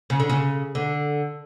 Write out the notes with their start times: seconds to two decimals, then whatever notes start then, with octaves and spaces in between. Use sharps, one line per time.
0.10 C#3
0.20 D3
0.30 C#3
0.75 D3